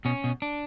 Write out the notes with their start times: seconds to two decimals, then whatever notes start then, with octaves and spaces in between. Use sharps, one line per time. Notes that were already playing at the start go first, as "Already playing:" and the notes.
0.05 B2 C#4
0.24 B2
0.42 D4